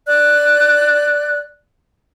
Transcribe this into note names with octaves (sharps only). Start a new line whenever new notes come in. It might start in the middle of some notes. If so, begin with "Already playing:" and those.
D5 F#6